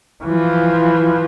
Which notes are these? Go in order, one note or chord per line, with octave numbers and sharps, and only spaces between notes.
E3 F3